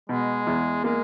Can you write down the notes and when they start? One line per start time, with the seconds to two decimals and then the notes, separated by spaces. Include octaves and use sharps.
0.09 B2 G#3
0.47 E2
0.84 G#3 A#3